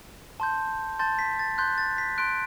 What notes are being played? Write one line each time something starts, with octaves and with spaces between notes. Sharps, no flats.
A5 C6 G6
A5 C6 G6 A6
B6
A6
C6 F#6 G6
A6
B6
C6 F#6 D7